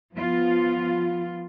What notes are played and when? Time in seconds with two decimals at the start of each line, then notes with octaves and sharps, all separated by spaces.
0.14 F3 B3 F4